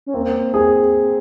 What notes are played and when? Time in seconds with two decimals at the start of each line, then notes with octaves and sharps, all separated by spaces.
0.07 C#4
0.14 A#3 C4
0.54 G#4